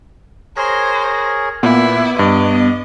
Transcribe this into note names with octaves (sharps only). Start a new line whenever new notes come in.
G#4 A#4 C5 C#5 A#6
A#2 B3 E4 D6
G2 D#5